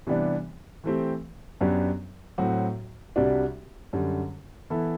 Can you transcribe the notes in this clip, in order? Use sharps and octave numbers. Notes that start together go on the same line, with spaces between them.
C3 E3 G3 B3 D4
E3 A3 C4 G4
F#2 F#3 B3 D4 G4
A2 F#3 C4 F#4
C2 C3 G3 D4 F#4
F#2 D3 G3
E3 B3 E4 A4